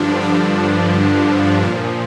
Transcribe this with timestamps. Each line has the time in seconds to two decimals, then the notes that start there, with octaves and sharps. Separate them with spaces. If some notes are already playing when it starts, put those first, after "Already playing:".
Already playing: G2 D3 F3 D4
0.21 D3 D4
1.62 A#2 F3